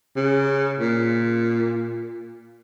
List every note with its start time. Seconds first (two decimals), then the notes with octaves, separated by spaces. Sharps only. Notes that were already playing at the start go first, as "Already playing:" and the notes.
0.16 C#3
0.80 A#2